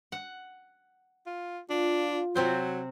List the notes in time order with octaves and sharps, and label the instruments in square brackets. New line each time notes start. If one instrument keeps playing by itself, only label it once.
[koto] F#5
[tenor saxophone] F4
[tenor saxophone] D4 [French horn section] F4
[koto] C3 C4 C5 [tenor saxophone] F#3